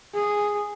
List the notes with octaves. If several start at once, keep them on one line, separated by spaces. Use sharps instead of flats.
G#4